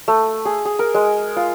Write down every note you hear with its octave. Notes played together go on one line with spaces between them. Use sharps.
A3
G#4
G#4
A#4
G#3
F4